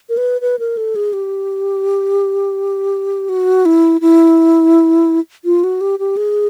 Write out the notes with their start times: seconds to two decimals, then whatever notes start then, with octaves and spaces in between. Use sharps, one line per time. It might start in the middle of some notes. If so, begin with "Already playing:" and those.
0.09 A#4
0.17 B4
0.41 B4
0.59 A#4
0.77 A4
0.96 G#4
1.13 G4
3.29 F#4
3.65 E4
4.01 E4
5.45 F4
5.64 F#4
5.81 G4
5.99 G4
6.17 G#4